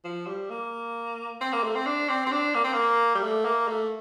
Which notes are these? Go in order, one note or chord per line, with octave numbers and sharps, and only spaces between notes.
F3
G3
A#3
C4
A#3
A3
C4
D4
C4
C4
D4
A#3
C4
A#3
G3
A3
A#3
A3